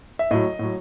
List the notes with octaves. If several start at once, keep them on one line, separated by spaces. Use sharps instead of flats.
E5
A2 F#3 D#5
A2 F#3